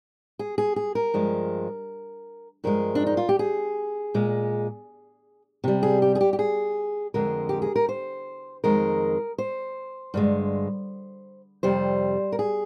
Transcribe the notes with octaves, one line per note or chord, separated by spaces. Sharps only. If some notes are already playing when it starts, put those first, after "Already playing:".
G#4
G#4
G#4
A#4
G2 F3 G#3
G2 F3 G#3 A#4
D4
D#4
F4
G4
G#4
A#2 G#3
C3 G3
G#4
G4
G#4
G4
G4
G#4
F2 D3 G#3 A#4
G4
G#4
A#4
C5
F2 D#3 G#3 A#4
C5
G2 D3 G#3
F2 C3 G3 C5
A#4
G#4